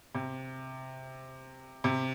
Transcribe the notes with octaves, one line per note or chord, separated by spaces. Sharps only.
C3
C3